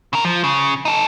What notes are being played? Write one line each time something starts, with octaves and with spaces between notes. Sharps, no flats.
C#3 A#4
F3
C#3
D#4 A4